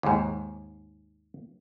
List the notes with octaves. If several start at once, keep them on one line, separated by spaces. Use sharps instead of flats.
D#2 G#2